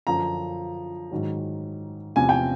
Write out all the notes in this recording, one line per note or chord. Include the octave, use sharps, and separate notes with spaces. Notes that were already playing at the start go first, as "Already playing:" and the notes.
F#2 D3 F3 A#5
G#2 D#3 F#3
E2 C3 F3 G#5
G5